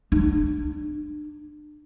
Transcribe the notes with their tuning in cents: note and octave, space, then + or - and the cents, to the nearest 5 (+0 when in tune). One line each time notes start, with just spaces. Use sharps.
D4 +30